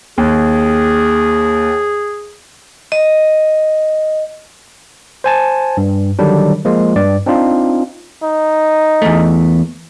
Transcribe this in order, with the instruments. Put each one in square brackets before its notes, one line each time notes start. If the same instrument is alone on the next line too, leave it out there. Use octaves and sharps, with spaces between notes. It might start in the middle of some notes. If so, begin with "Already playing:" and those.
[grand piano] D#2 [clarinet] G#4
[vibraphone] D#5
[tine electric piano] C5 G#5 A5
G2
D3 D#3 F#3 G3 D4
F3 G#3 A#3 F4
G2 D5
C4 D4 D#4 F4
[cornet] D#4
[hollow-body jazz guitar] E2 A3